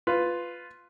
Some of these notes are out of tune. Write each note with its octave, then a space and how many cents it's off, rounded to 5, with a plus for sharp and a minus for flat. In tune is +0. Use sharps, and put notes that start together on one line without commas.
F4 +0 B4 +10